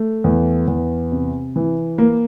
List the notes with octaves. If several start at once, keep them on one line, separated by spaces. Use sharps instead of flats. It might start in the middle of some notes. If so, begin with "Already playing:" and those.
Already playing: A3
E2
E2
C3
E3
A#3